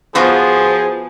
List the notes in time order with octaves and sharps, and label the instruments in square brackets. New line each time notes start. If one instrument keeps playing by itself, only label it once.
[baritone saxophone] F3 [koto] B3 F4 F#4 [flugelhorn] G#4